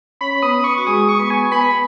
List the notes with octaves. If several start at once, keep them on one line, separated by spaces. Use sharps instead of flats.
C#4 C#5 B5
B3 B4 D#6
B3 B4 C#6
F#4
G#3 G#4 D#6
C#6
B3 B4
G#5
B3 B4 B5